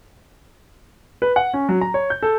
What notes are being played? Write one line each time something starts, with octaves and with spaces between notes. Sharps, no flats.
B4
F#5
C#4
F#3
A#5
C#5
G6
A4